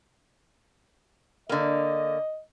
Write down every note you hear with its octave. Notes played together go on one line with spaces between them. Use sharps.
D3 A#3 D#5